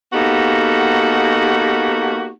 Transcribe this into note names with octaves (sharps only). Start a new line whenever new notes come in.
A#3 B3 D#4 F#4 G4 A4